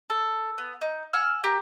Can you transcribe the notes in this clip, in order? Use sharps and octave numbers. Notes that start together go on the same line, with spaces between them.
A4
B3
D#4
F#5 G#5 E6 F6
G4 A#4